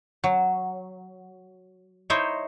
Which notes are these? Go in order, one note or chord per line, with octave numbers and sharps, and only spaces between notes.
F#3
D#4 E4 C5 C#5 D#5